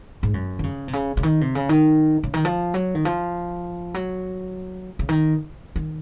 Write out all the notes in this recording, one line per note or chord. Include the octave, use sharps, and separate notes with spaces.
G#2
F#2
D#3
C#3
C3
C#3
C#3
D#3
C3
C#3
D#3
C#3
D#3
F3
F#3
D#3
F3
F#3
C#3
D#3
D#3